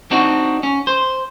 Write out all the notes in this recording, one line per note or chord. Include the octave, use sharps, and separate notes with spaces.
C4 D4 D#4 F#4
C#4
C5